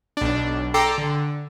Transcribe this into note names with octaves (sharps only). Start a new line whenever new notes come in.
B1 D4
A4 G5 A#5 C6 D6
D3